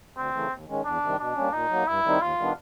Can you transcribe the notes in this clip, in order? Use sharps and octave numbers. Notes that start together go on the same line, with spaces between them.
D2 C4
C#3 E3 A3
D#2
D#3 G#3 C#4
E2 D4
C3 D#3 G3
B2 D4
G3 A#3 C#4
A#2 D#4
F#3 A#3
G2 E4
D#3 G3 C4 D#4
D#2 F4
D#3 G3 B3 D4